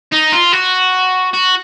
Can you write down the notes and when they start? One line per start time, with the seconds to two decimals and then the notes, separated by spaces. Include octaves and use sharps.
0.12 D#4
0.33 F4
0.53 F#4
1.33 F#4